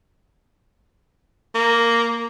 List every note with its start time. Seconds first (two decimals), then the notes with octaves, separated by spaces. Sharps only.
1.55 A#3